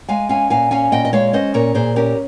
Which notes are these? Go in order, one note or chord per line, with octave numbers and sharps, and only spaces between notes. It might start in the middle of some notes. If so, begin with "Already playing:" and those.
G#3 F5 G#5
C#4 F5 G#5
A#2 F5 G#5
C#4 F5 G#5
A#2 D#5 G5
D#5
G#3 C#5 F5
C#4 C5 D#5
A#2 A#4 C#5
A#2 G#4 C5
C#4 G4 A#4